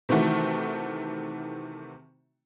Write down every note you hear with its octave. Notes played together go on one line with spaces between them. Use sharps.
C3 D#3 E3 A3 F#4